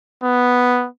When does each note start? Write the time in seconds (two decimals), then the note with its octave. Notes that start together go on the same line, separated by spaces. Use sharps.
0.24 B3